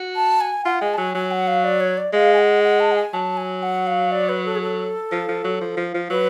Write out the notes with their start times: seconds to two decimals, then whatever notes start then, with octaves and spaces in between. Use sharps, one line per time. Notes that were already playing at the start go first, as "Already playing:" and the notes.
Already playing: F#4
0.16 A5
0.41 G#5
0.65 F4 F#5
0.81 G#3 G#5
0.94 A5
0.98 F#3 G#5
1.15 F#3 G#5
1.31 F#5
1.48 F5
1.64 D5
1.80 C#5
1.98 D5
2.13 G#3 F5
2.34 G#5
2.38 F#5
2.64 F#5
2.80 A5
2.91 F#5
2.96 G#5
3.14 F#3 A5
3.37 G#5
3.63 F#5
3.87 F5
4.12 D5
4.29 B4
4.46 A4
4.55 G#4
4.62 A4
5.12 F3
5.29 F3
5.44 F#3
5.61 F3
5.77 F3
5.94 F3
6.10 F#3 B4